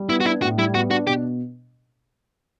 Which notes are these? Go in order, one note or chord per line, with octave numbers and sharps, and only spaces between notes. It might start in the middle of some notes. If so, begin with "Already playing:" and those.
Already playing: G3
B3 E4
F#4
D4 E4
A2 F#4
G3 E4
B3 F#4
D4 F#4
B2 G4